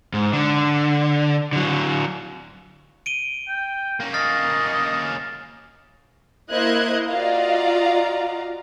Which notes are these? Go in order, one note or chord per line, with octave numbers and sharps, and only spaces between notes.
G#2
D3
D3 F#3
D7 D#7 G7
G5
A#3 C#4
D#5 F6 A6 C7
A#3 E4 C5 D#5 F#6 G#6
F4 F#4 D5 D#5 F5 A#5